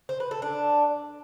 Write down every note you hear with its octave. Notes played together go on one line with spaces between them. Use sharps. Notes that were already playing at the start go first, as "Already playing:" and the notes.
C5
B4
A4
D4